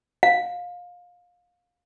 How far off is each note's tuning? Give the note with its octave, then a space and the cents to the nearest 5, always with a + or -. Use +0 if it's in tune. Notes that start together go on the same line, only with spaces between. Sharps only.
F5 +25